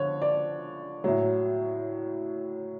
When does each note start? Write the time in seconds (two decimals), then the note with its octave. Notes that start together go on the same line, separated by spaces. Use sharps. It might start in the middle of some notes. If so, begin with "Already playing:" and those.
Already playing: D3 F3 C#5
0.22 D5
1.04 A2 F#3